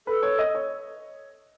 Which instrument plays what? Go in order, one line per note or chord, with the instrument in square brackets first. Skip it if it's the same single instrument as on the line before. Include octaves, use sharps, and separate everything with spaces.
[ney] A4 [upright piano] B4
[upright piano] C#5
D#5
C#5